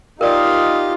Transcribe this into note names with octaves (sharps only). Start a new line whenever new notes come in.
D#4 F4 G4 A#4 D5 D#5 F5 D#6